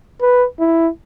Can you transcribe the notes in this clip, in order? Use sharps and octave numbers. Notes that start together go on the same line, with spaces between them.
B4
E4